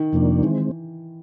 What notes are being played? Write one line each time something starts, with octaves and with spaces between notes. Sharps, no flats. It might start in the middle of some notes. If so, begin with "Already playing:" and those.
Already playing: D#3
F2 C3 F3 A#3 D4
D#3 E3 G#3 C4